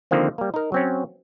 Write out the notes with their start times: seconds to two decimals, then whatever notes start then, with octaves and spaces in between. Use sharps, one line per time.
0.11 D3 D#3 F3 A#3 C4
0.38 G3 A#3
0.54 D#4 A#4
0.72 F#3 C4 C#4